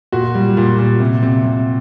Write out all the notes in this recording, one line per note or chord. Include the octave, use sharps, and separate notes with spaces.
A#2 F#4
G3
A#2
A#2
C3
C3
C3